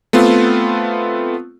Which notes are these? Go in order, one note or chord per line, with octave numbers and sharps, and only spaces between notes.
A3 B3 C4 F4